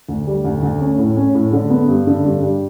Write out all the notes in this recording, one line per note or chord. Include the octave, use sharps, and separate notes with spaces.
D2
G3
D2
D2
C#4
A2
C#4
A2
D3
B3
G2
D3
G2
G3